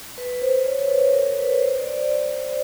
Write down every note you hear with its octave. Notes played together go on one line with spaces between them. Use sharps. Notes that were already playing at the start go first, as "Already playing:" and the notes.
B4
C5
C#5
B4
C5
A#4
B4
C5
D5
D5
D5
C5